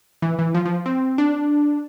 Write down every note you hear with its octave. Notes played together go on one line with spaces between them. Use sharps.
E3
E3
F3
F3
C4
D4